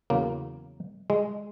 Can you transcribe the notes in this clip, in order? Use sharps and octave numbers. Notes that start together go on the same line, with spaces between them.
E2 C#3 F#3 A#3
G#3